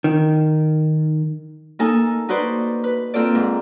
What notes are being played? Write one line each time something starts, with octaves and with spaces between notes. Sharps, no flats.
D#3
A#3 D#4 A4 G#5
D#4 F#4 B4 C5 D5
B4
A#3 C4 F4 A4 D5
G#2